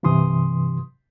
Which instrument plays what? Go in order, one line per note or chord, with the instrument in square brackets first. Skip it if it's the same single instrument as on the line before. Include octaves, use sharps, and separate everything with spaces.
[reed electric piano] G2 C3 E3 C6 D#6